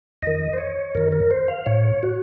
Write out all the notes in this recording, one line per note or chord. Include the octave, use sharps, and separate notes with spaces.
F2 D#3 D#5
C5
C#5
F#2 D#3 A#4
A#4
C5
F5
A2 C#5
F#4